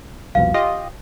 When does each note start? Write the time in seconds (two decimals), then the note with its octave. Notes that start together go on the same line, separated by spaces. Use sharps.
0.35 C2 F2 B2 F5
0.54 F4 G4 D#5